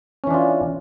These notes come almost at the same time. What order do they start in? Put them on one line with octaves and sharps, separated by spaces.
C#4 E3 D4 F4